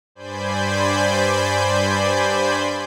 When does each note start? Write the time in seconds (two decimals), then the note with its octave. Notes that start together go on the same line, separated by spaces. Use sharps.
0.15 G2 C5 D5 G#5 B5 G6